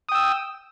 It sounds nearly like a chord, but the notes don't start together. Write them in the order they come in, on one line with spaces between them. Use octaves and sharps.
D#6 G5 E6